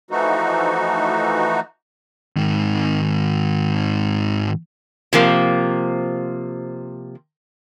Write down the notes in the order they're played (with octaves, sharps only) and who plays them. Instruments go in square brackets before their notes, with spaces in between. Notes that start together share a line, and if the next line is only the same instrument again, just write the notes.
[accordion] E3 F3 A3 D#4 F#4
[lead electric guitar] G#2 D#3
[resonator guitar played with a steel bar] C3 F3 A#3